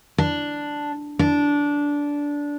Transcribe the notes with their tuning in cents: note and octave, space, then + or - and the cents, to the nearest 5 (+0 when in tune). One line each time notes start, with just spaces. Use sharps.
D4 +0
D4 -15